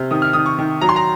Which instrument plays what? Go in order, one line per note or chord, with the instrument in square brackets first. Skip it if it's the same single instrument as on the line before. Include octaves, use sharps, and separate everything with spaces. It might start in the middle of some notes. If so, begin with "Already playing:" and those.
Already playing: [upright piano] C3 [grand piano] F6
[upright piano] D#3 [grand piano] D#6
[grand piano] F6
[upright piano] D#3 [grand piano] D#6
[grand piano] C#6
[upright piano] D#3
[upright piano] F#3 [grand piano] A#5
[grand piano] C6
A#5